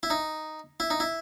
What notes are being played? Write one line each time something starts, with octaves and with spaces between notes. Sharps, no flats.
E4
D#4
E4
D#4
E4